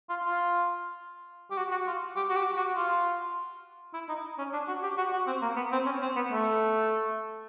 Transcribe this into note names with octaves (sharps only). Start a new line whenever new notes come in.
F4
F4
G4
F#4
F#4
F4
G4
F#4
G4
F#4
F4
E4
D#4
C#4
D4
F#4
G4
F#4
F#4
C4
A#3
B3
C4
C#4
C4
B3
A3